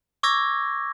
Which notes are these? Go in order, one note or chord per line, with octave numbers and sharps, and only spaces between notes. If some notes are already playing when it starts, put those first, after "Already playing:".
C#6 D6 E6 G#6 A#6